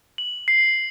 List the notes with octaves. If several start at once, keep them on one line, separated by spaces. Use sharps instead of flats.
F#7
C7